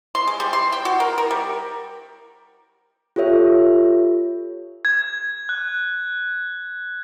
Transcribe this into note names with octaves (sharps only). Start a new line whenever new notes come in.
C6
G#3
G3
C6
G5
F#4
A#4
A#4
G3
F4 G4 A4 C#5 E5
G#6
F#6